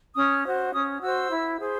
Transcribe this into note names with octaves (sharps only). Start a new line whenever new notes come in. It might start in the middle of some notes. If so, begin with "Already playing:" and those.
C#4 D#6
F#4 C5
C#4 D#6
F#4 C5 E6
E4
G#4 C5